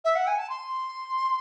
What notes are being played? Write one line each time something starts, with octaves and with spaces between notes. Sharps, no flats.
E5
F#5
G#5
A5
C6